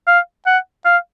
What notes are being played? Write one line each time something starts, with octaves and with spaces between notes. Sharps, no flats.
F5
F#5
F5